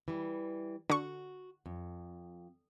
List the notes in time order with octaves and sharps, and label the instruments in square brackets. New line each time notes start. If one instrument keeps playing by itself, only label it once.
[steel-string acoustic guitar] E3 G3
[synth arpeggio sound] D3 C#6 [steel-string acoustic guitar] F#4
[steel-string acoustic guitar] F2